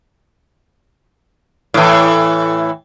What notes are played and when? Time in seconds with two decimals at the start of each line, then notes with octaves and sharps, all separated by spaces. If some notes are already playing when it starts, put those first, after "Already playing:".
1.74 A2 E3